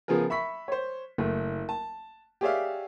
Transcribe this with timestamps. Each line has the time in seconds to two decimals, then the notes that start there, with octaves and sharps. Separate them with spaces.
0.08 C#3 F3 B3 G#4 A#4
0.30 E5 B5 C#6 B6
0.68 C5 C#5
1.18 F#1 A3
1.69 A5
2.41 G4 G#4 C#5 D5 E5 F5